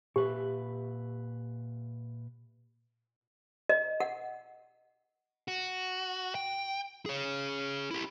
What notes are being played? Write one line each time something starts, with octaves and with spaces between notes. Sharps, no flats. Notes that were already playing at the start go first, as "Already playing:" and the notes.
A#2 G4 B4 E5
D#5
F#5
F#4
G5
G#4 C#5
E4 G4